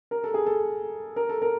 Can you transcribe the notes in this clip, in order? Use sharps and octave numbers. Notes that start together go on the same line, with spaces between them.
A#4
A4
G#4
A4
A#4
A4
A#4